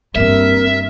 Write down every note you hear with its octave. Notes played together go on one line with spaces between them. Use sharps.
G2 A#3 C4 A#4 E5 F6